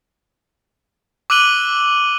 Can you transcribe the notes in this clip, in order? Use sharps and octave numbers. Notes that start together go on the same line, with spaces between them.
D6 E6 F#6 D#7 F#7 G7